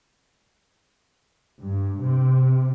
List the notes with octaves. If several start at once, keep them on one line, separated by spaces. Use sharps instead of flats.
G2
C3